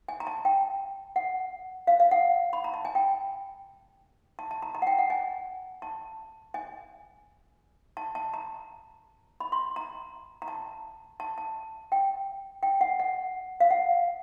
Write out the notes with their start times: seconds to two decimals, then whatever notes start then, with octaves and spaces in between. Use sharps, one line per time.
0.08 G#5
0.20 A#5
0.27 A5
0.45 G5
1.16 F#5
1.87 F5
2.00 F5
2.11 F#5
2.53 B5
2.64 A#5
2.74 A5
2.85 G#5
2.95 G5
4.39 A5
4.51 A5
4.62 A#5
4.75 A#5
4.82 F#5
4.87 G5
4.98 F#5
5.10 G#5
5.82 A5
6.54 G#5
7.97 A5
8.15 A5
8.34 A#5
9.40 B5
9.52 C6
9.76 A#5
10.42 A#5
10.48 A5
11.20 A5
11.38 A5
11.92 G5
12.63 G5
12.81 F#5
13.00 F#5
13.60 F5
13.71 F#5